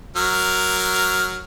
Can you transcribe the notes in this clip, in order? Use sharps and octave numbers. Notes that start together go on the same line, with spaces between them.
F#3 A#4 F6